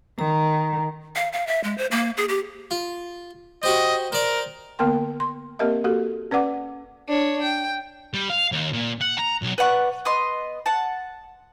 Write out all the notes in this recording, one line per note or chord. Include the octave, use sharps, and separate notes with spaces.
D#3 A#5
F5
F5
E5
G#3
C5
A#3
G#4
G4
F4
F#4 G4 C5 D#5
A#4 C5 D5
D3 A#3 B3 A#4 G5 C6
C6
A#3 C4 G4 A#4 D#5 E5
A#3 F#4 G4 A4
C#4 B4 D5 F#5 D6
D4 C#5
G5
G3
F5
D#2
A#2
F#5
A#5
B1
B4 D5 F#5 C#6
B3 D#5 C6
F#5 A5